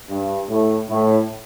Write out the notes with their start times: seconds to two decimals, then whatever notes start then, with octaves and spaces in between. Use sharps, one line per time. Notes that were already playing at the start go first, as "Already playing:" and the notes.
0.09 G2
0.49 A2
0.89 A2